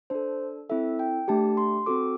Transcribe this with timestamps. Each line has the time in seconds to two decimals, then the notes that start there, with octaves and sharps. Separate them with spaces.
0.10 D4 A4 C5
0.69 C4 E4 A4 E5
0.99 G5
1.28 A3 D4 G4 A5
1.57 C6
1.86 C4 F#4 A4 D6